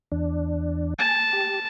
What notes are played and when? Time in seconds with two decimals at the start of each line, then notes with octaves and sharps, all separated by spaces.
0.12 E2 D4
0.99 G#5 A5
1.33 G4